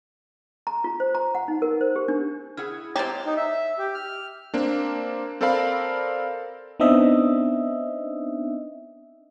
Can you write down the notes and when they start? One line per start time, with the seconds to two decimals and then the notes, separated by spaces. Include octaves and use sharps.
0.67 A#5
0.84 F4
1.00 C5
1.15 A#5
1.35 F#5
1.48 D#4
1.62 A#4
1.81 C5
1.96 G4
2.08 D4
2.57 E4 G#4 F#5 F6
2.96 G#3 A#3 C4 G4 C#5 A#5 A6
3.24 D#4
3.36 E5
3.78 G4
3.94 F6
4.54 A#3 C4 D4
5.41 C4 A4 A#4 D5 F5 B5
6.80 B3 C4 D4 D#4 D#5 E5